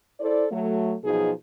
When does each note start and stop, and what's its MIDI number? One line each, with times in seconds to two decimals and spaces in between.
0.20 0.46 64
0.20 0.46 69
0.20 0.46 72
0.20 0.46 74
0.52 0.95 54
0.52 0.95 57
1.04 1.32 47
1.04 1.32 53
1.04 1.32 54
1.04 1.32 63
1.04 1.32 68